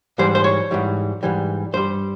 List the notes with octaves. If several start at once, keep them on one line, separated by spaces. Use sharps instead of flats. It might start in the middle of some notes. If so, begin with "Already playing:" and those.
G#2 E3 G3 C5
C5
C#5
G#2 E3 G3
G#2 E3 G3
G2 G3 C5